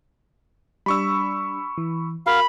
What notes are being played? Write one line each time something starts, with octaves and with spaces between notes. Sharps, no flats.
G3 D4 B5 C#6 E6
E3
F#4 A#4 F5 B5 F6